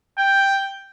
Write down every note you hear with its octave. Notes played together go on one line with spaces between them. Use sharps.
G5